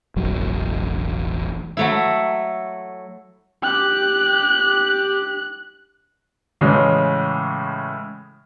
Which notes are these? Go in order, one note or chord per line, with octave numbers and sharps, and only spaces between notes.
E1 A1 F#3
F#3 A3 E4
G4 F#6
A2 C#3 E3 G#3 C#4